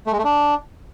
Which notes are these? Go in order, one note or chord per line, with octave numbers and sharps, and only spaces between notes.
A3
G#3
A3
D4